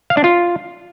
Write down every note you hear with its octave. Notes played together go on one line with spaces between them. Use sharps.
F5
D4
F4